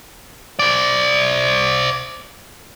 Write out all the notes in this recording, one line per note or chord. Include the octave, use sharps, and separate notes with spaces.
C5 D5